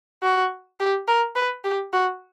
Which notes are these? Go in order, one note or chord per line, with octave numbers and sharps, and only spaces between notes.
F#4
G4
A#4
B4
G4
F#4